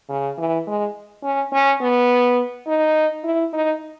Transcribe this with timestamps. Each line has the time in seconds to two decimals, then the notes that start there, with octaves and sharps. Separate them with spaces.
0.09 C#3
0.38 E3
0.67 G#3
1.23 C#4
1.52 C#4
1.81 B3
2.67 D#4
3.24 E4
3.53 D#4